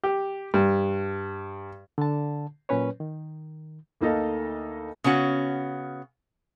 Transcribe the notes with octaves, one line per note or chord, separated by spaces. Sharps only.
G4
G2
D3 A5
A#2 F#3 C#4 B4 C#5
D#3
D2 A#3 D#4 A4 D#5 F5
C#3 B3 C#4 F#4